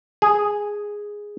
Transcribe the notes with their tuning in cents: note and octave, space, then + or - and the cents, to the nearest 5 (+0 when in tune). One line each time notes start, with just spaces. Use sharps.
G#4 -5